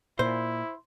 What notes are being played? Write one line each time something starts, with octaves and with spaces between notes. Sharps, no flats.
A#2 E4 C5